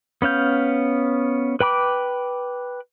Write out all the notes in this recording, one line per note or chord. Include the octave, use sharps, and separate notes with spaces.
B3 C#4 F5 G6
B4 G5 B5 D6